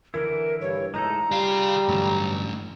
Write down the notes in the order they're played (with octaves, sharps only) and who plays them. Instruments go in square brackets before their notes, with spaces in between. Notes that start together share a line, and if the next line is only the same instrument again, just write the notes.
[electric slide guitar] D3 E3 E4 [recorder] A#4
[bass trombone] G2 [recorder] C#5
[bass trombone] A2 [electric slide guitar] G#3 D#4 A4 [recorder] A#5
[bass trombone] G3 [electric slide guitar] F4 [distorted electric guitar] G#4 F5
[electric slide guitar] G2 D3 F#3 [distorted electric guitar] E3 A3